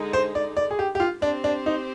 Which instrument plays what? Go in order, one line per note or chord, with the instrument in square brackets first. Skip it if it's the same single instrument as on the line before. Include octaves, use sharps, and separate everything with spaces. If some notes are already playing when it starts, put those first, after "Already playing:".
Already playing: [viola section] D3 G#3 D#4
[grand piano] C5
D5
D5
G#4
G4
G4
F4
[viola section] C4 G4 C5 [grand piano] D4
[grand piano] D4
D#4